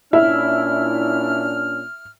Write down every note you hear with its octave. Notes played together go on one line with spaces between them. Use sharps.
A#2 C#4 D4 E4 E5 F6